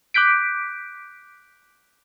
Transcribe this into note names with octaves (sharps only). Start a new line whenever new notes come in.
D6 F#6 G6 B6 D7